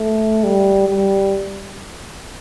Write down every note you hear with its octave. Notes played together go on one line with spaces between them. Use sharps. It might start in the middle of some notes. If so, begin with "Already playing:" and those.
Already playing: A3
G3
G3